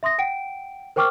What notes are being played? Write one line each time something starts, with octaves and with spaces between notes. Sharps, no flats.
E5 C6 D#6 A#6
F#5 G5 D7
A#4 C5 G5 C#6 D6 F6